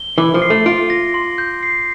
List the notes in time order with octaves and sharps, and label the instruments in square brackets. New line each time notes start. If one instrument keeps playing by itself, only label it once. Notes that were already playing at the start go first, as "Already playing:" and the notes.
Already playing: [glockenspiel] G7
[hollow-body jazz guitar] E3 [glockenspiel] D6
[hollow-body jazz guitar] F3
[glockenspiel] C7
[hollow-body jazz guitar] A3
[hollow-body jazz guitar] F4 [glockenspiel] D7
[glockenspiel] A#6
C6
G6
C7